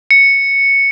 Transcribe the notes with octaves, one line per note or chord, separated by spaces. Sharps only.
C#7